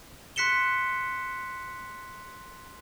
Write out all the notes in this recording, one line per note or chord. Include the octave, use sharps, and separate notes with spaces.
C6 F#6 B6 C#7 E7 G7